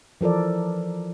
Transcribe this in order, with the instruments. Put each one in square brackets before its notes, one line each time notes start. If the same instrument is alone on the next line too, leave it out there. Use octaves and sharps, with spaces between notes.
[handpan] E3 F3 A4 A#4 D5